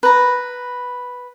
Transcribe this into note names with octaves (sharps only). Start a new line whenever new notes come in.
B4 A#5